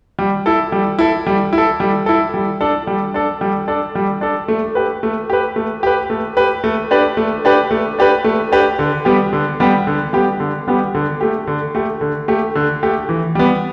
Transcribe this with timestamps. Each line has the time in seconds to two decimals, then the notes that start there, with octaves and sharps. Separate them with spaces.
0.19 G3
0.46 E4 A4
0.72 G3
0.99 E4 A4
1.27 G3
1.53 E4
1.58 A4
1.80 G3
2.06 E4 A4
2.34 G3
2.61 D4 A4
2.87 G3
3.14 D4 A4
3.41 G3
3.68 D4 A4
3.95 G3
4.21 D4 A4
4.48 A3
4.75 G4 B4
5.03 A3
5.30 G4 B4
5.56 A3
5.83 G4 B4
6.10 A3
6.37 G4 B4
6.64 A3
6.91 D4 G4 B4
7.17 A3
7.45 D4 G4 B4
7.71 A3
7.99 D4 G4 B4
8.24 A3
8.52 D4 G4 B4
8.79 D3
9.05 G3 B3 G4
9.33 D3
9.60 G3 B3 G4
9.87 D3
10.13 G3 B3 G4
10.40 D3
10.68 G3 B3 G4
10.95 D3
11.21 A3 G4
11.47 D3
11.75 A3 G4
12.01 D3
12.28 A3 G4
12.55 D3
12.83 A3 G4
13.09 E3
13.35 G3 B3